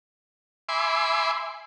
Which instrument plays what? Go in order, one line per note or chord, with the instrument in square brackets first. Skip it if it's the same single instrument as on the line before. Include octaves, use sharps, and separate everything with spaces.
[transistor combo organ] E5 G#5 B5 C6 D6